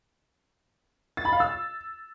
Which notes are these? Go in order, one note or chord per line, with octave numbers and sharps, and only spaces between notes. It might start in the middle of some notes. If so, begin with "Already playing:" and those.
A6
B5
F5
E6